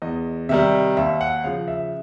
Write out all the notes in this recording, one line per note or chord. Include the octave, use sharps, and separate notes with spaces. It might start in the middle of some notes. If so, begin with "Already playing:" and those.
E2 D#5
C3 D#3 G3 E5
D#2 E5
F#5
C#3 F3 F5
E5